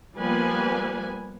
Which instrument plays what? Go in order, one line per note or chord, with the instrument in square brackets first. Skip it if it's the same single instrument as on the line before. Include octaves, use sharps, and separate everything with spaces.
[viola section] F3 G3 A#3 B3 B4 G#5